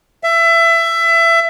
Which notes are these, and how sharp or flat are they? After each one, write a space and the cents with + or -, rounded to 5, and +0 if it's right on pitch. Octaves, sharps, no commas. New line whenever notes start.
E5 +25